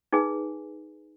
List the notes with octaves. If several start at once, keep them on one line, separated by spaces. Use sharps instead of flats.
D#4 G#4 B4 G#5